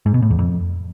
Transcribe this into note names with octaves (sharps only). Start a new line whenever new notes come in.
G#2
B2
A2
E2
F2